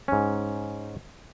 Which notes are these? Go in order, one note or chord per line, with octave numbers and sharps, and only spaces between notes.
G#2 C#4